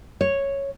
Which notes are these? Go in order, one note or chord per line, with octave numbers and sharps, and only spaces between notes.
C#5